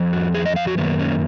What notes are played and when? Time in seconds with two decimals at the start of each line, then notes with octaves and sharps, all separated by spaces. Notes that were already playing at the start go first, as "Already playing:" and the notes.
Already playing: F2 F3
0.13 F#4
0.34 G#4
0.46 D#5
0.56 F5
0.67 F#4
0.78 F#2 D#3 A#3 B3
0.99 C#4